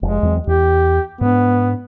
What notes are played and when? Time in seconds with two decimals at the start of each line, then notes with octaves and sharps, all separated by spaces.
0.03 F1 G#3
0.23 E2 F#3 C4
0.47 E2 G4
1.21 G#2 B3 D4